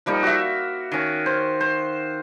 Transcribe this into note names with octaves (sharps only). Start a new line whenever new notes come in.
F3 G3 A#3 D#4
F#4 E5
D#3 C#4
C5
C5